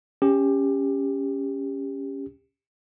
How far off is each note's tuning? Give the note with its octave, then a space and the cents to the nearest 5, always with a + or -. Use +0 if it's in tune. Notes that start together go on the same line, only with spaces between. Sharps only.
C#4 +0 G4 +20